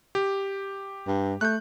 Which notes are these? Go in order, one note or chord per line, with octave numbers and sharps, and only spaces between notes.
G4
G2
A3 F#6 G6